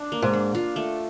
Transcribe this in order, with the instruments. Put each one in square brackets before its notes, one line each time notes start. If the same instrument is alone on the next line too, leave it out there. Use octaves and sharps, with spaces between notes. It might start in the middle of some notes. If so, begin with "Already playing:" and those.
Already playing: [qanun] D4
A#3
[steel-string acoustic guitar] G#2
[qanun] D4
F4
A3